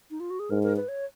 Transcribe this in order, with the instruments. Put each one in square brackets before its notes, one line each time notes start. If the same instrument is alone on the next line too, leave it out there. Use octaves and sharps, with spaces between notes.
[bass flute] D#4
F4
F#4
G#4
[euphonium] G#2 [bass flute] A#4
[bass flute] A#4
B4
C#5